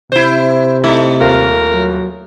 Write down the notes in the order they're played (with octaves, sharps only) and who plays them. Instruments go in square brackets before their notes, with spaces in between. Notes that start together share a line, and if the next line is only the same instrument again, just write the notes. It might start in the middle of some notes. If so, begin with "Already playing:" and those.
[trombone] C3 [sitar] E4 C5
[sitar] A3 [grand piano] D#4 E4
[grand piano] D#1 F4 [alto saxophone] A#4
[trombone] F#3